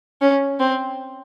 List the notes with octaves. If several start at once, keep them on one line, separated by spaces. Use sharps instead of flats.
C#4
C4